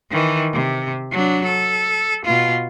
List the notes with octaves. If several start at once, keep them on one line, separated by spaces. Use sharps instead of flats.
D#3 E3
C3
F#3 D4
A4
B2 F4